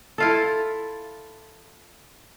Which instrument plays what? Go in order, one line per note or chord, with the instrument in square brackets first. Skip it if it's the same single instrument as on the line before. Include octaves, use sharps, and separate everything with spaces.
[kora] E4 F4 A4